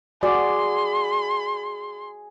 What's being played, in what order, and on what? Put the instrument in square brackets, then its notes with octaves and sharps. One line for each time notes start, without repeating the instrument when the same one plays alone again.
[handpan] F#4 D5 [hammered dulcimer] G#4 [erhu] C6